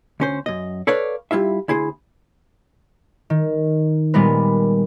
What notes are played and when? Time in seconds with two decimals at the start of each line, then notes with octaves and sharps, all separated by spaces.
0.20 D2 C#4 C5
0.46 F#2 D#5
0.87 A4 B4 C#5 D5 F5
1.31 G3 E4 F4 E5
1.68 D2 E4 G#4 C5
3.30 D#3
4.14 A#2 G3 G#3 B3 A#4 B4